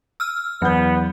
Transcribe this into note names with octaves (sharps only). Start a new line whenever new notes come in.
E6 F6
E2 F#3 B3 G6